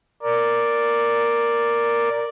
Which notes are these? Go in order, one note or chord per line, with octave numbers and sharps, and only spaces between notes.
A#4 D5